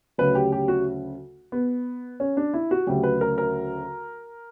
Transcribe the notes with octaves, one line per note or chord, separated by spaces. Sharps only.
D2 C#3 F#3 B4
G4
G4
F#4
B3
C#4
D4
E4
F#4
D2 C#3 F#3 G4
B4
A#4
A#4